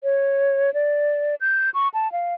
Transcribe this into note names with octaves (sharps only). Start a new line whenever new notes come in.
C#5
D5
G6
C#6
A5
F5